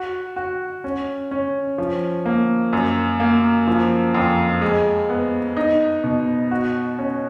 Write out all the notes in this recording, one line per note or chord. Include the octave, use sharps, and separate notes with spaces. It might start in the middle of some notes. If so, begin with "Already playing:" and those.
Already playing: F#4
F#4
C#4
C#4
F3
A#3
F#2
A#3
F3
F2
G#3
B3
D#4
B2
F#4
C#4